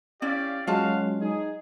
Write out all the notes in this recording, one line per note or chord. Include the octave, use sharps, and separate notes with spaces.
C#4 E4 G4 D5 F5
F#3 G#3 C#4 F4 F#4 F5 A5
D#4 G#4